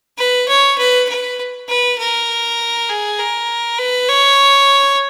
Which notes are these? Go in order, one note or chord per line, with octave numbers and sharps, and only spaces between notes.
B4
C#5
B4
B4
B4
A#4
G#4
A#4
B4
C#5